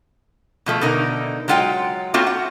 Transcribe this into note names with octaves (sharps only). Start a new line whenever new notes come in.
B2 F3 A3
B2 D3 D#4 A#4
F#3 G#3 F4 F#5 G5
A3 A#3 C4 F4 F#4 C#5
F#5